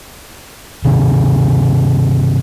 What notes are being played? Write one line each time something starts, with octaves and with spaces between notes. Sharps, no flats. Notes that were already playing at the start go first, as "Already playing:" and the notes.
G2 C3 D#3